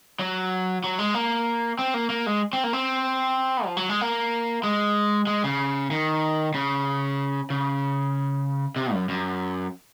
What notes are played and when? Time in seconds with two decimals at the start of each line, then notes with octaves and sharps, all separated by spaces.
0.20 F#3
0.84 F#3
0.99 G#3
1.14 A#3
1.79 C4
1.94 A#3
2.10 A#3
2.26 G#3
2.53 C4
2.64 A#3
2.73 C4
3.65 F3
3.77 F#3
3.89 G#3
4.01 A#3
4.64 G#3
5.27 G#3
5.44 C#3
5.91 D#3
6.54 C#3
7.50 C#3
8.76 C3
8.93 F#2
9.09 F#2